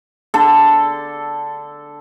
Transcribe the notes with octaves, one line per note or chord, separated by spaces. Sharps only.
D3 A4